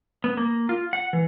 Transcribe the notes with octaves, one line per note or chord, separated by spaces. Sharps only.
B3
A#3
F4
F#5
E3